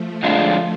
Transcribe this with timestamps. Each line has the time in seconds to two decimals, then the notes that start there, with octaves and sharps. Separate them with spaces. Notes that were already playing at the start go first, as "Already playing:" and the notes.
Already playing: F3 A3
0.23 F2 D3 G#3 D4 F4